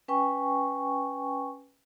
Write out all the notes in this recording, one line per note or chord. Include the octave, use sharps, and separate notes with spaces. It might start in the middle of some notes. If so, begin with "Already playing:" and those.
C#4 B4 G5 G#5 C#6